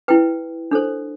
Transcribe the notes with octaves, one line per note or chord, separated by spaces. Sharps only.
E4 B4 G5
D4 A4 C5